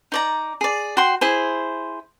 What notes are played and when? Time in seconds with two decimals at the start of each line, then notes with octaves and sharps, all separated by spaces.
0.12 D#4 D5 A#5
0.61 G#4 D5
0.97 F#4 G5 C6
1.21 E4 G#4 C5